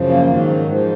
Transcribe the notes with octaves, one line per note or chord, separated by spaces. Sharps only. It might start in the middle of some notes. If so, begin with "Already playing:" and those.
Already playing: F#2 C#3 F3
A#3
G#2 D#3 F#3
G#2 F3